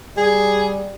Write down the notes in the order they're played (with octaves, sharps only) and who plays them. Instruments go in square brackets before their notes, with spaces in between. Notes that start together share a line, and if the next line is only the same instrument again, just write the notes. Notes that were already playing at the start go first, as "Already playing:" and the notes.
[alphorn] G3 [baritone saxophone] G#4